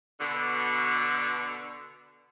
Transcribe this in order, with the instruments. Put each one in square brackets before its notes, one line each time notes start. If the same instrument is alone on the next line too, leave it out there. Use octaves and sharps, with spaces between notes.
[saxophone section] B2 D3